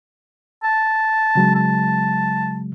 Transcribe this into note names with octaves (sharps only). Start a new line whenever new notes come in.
A5
C#3 F#3 G#3
A5